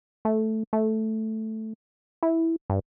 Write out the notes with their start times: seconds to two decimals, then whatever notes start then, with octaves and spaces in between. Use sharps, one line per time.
0.25 A3
0.73 A3
2.23 E4
2.70 G2